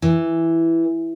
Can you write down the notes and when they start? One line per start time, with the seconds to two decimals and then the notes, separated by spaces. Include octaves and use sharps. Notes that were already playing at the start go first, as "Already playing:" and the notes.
0.02 E3